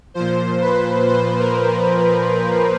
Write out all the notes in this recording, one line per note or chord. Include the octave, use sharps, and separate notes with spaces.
A#2 F3 C5
B4
C5
A#4